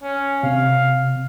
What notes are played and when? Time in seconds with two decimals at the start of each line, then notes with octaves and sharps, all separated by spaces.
0.03 C#4
0.43 C3 F5